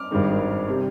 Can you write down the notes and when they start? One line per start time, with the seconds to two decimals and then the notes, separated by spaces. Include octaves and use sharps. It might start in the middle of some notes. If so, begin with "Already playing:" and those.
Already playing: D6 F6
0.11 G#1 G2 D#3 G#3
0.69 C3 G3